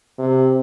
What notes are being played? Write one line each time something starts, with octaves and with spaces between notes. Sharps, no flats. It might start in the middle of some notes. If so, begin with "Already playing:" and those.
C3